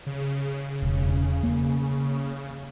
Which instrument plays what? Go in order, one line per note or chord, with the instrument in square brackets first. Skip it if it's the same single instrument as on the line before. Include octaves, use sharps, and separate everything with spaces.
[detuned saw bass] C#3
[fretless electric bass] E1
A#3